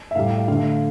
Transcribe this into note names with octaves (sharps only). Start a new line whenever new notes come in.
E5
A2 G3 F5
D3 A3 F5